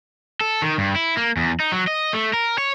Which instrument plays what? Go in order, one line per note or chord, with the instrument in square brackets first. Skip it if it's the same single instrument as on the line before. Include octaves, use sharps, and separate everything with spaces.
[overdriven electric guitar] A4
D#3
G2
E4
A#3
E2
D#4
F#3
D#5
A3
A#4
C#5